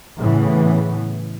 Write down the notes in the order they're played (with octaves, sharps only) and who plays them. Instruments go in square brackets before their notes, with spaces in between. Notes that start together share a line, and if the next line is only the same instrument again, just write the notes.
[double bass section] A2 C#3 E3 B3